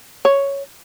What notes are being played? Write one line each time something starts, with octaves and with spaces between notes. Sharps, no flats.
C#5